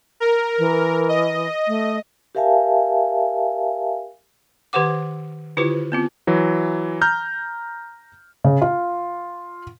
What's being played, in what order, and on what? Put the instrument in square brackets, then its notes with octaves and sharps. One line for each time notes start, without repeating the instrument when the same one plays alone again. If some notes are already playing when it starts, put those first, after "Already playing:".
[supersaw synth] A#4
[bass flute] E3
[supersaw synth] D#5
[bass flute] A3
[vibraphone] G4 A#4 E5 F5 G#5 A5
[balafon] D#3 G4 B4 C5 F#5 D6
D3 E4 F4 G4 B4 C5
B3 C4 F4
[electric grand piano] E3 F#3
A#5 F6 G6
[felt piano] C#3
F4